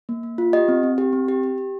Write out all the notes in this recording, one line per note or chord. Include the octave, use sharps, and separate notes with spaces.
A#3
A#3
F4
G4 D#5
C4
C4
G4
C4
G4
G4
G4